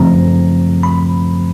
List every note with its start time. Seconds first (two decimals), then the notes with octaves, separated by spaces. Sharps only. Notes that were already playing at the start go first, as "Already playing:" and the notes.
Already playing: F#2 C#3 F3 A3 C4 A#5
0.83 B5